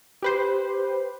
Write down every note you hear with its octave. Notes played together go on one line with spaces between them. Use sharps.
G4 B4 C5